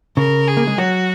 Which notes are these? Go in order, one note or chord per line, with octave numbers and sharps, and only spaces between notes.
C#3 A#4
G#4
A#3
G#3
F#3 F#4